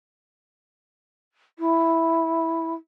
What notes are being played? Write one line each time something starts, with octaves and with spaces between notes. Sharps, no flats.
E4